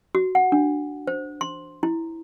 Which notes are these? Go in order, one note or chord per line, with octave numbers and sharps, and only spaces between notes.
F#4
F#5
D4
C5
C6
E4